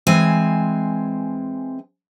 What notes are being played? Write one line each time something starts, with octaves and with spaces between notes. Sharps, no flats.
E3 G#3 C4 G#5